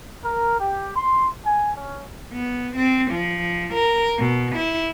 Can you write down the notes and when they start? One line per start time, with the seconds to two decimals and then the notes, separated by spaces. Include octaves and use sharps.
0.23 A#4
0.59 G4
0.94 C6
1.45 G#5
1.76 C#4
2.32 B3
2.76 C4
3.11 F3
3.74 A#4
4.18 B2
4.56 E4